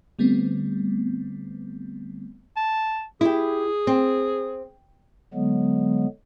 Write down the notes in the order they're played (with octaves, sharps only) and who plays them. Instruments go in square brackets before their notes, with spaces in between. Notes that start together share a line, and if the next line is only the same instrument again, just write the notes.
[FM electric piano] D3 G3 A3 B3 C4
[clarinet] A5
[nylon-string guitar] E4 G4 [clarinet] G#4
[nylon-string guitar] C4
[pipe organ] D3 F#3 G#3 B3